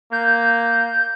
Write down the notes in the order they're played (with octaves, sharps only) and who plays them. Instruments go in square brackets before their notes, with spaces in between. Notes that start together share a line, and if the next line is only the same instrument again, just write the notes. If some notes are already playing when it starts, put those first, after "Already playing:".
[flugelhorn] A#3 [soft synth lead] G6